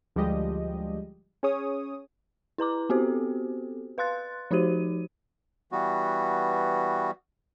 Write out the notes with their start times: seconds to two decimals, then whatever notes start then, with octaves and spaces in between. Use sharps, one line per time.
0.16 D2 F3 G3 G#3 G4 D#5
1.43 C#4 G#4 C#5 D#6
2.58 E4 B4 A#5 D6
2.90 B3 C4 F#4 G4 A4 C5
3.98 B4 F5 C6 F#6 A6
4.51 F3 D#4 F#4 G4 C5 D#7
5.72 E3 G3 B3 F#4